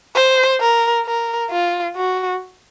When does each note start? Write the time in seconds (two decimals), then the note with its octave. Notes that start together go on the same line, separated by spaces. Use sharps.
0.16 C5
0.60 A#4
1.06 A#4
1.51 F4
1.96 F#4